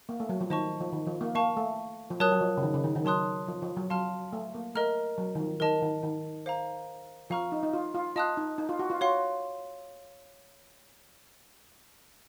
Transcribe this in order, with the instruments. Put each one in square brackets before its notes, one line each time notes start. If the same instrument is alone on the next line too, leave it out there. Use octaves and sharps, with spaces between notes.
[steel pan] A#3
A3
F#3
F3
[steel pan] D#3 [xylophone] C5 D#5 A5 C#6
[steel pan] F3
D#3
F3
A#3
[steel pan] A#3 [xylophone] F5 A5 C#6
[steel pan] A3
F3
[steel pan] F#3 [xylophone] A#4 C#5 A5 D#6 F#6
[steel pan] F#3
F3
C#3
D#3
C#3
D#3
D#3
[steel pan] F#3 [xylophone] C#5 A5 C6 D#6 F#6
[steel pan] F3
F3
F#3
[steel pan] F#3 [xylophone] F5 A5 C6 F6
[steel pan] A3
A#3
[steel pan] A3 [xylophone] A#4 D#5 A#5 F6
[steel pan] F#3
D#3
F3
[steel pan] D#3 [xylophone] A#4 D#5 A5
[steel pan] D#3
D#3
[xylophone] C5 F5 A#5
[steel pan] F3 [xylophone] F5 A#5 C#6 F6
[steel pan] D#4
D#4
F4
F4
[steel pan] F4 [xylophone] D#5 A5 D#6 F#6
[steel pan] D#4
D#4
F4
F#4
F4
[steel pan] F#4 [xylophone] C#5 F5 C6